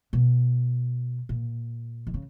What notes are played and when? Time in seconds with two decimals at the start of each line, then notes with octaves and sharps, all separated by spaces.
0.13 B2
1.29 A#2
2.07 D#3
2.14 C#3